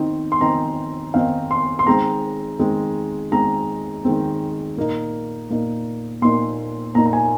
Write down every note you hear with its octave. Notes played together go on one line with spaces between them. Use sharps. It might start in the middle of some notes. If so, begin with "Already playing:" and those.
Already playing: D#3 C4 D#4
C6
D#3 C4 D#4 A#5
D#3 C4 D#4 F5
C6
C6
D#3 G#3 C4 A#5
D#3 G#3 C4
D#3 G#3 C4 A#5
D#3 G#3 C4
A#2 A#3 D#4
A#2 A#3 D#4
A#2 A#3 D#4 C6
A#2 A#3 D#4 A#5
A#5
G#5